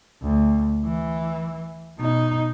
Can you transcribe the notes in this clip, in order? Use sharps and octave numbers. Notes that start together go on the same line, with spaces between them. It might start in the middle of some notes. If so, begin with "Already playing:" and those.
D2
E3
B2 D#4